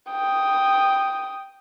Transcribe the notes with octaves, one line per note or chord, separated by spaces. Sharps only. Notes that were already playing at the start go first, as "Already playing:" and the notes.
G5 D#6